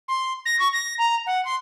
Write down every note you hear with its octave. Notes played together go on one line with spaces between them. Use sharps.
C6
A#6
C#6
A#6
A#5
F#5
C6